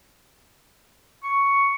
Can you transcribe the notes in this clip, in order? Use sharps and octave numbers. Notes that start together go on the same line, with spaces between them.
C#6